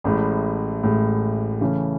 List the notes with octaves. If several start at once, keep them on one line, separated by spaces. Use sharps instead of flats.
A1 A2 G#3
A1 A2 G#3
C#3 E3 A3 C#4